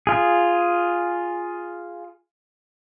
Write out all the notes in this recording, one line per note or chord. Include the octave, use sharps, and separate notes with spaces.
F4 G#4